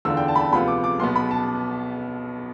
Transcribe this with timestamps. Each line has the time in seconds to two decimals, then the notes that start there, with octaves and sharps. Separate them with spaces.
0.05 E2 D3 A3 D4 F4 E6
0.17 G5
0.28 A5
0.36 B5
0.40 A5
0.52 D2 C3 F3 B3 F4 B5
0.68 D6
0.84 D6
0.99 B1 B2 B3 C6
1.16 B5
1.31 A5